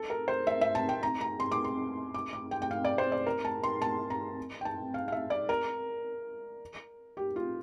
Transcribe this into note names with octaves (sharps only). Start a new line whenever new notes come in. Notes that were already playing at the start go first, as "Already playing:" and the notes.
Already playing: A4
A#4
C5
E5
E5
A5
G5
A#5
A#5
C6
D6
C6
D6
D6
G5
G5
F5
D5
C5
D5
A#4
A5
C6
A5
A#5
G5
A5
F5
F5
E5
D5
A#4
G4
F4